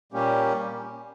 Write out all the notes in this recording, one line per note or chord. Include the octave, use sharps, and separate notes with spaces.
A#2 G3 A#3 C#4 G4